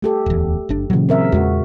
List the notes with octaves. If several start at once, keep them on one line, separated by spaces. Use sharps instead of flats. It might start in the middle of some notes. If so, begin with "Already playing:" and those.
A3 G4 A4
D1 E2
F#1 D4
A#2 C#3 E3 F#3
C4 A#4 E5
E2 G#3 C4 F#4